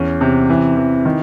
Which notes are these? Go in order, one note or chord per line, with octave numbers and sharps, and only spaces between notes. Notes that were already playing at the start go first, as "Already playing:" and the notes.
Already playing: E2 C#4
C3
E3
E3
D#3